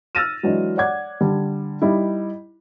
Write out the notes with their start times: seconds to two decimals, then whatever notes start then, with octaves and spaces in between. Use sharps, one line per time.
0.15 E6 F6 A6 A#6 D#7 E7
0.43 E3 F#3 G#3 D4
0.77 C#5 D5 F#5 D6 G#6
1.21 D3 G3
1.82 G3 D#4 E4